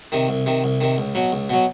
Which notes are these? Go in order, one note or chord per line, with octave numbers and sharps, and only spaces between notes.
C3 D#3
C2
C3 D#3
C2
C3 D#3
C#2
B2 F#3
C#2
B2 F#3